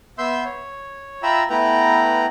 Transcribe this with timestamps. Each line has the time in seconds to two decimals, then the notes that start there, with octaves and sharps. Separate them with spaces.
0.18 B3 E5 C6 E6 G6
0.45 C#5
1.23 F4 E5 G5 A#5 B5 E6
1.50 A3 B3 E4 B4 G5 A#5